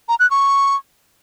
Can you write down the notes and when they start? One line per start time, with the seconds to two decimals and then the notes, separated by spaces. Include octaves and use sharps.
0.08 A#5
0.19 F#6
0.30 C#6